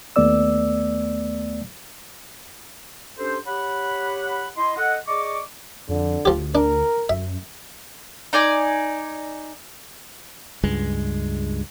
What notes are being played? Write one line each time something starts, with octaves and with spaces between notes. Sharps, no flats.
D#2 A3 B3 D5 E6
C#4 D4 G4 A4 C5
G4 C#5 F#5 B5
E4 D#5 C6
A4 D#5 F#5
G#4 D5 D#5 C#6 D6
F2 D3
D2 F3 G4
D4 A#4
F#2 E5
D#4 D5 G#5
C#2 G2 G#3